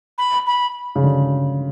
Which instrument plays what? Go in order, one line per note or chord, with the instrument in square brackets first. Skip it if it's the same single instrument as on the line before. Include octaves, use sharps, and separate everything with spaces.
[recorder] B5
B5
[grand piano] C#3
D3